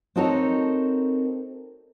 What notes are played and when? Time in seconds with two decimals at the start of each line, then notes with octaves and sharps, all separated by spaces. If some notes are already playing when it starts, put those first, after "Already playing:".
0.16 C4 D#4 F#4 A4 A#4 C#5